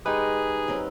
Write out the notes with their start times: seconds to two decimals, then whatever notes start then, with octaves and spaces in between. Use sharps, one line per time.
0.06 G#3 D#4 G4 G#4 B4
0.68 F#3 C4 C#4